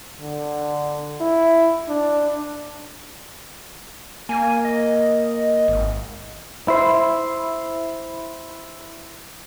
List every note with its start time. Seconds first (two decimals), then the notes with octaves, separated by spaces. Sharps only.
0.21 D3
1.21 E4
1.88 D4
4.29 A#3 G#5
4.64 D#5
5.68 G#1
6.68 E4 C5